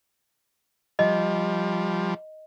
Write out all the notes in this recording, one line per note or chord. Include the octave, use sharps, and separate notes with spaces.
F3 G3 D#5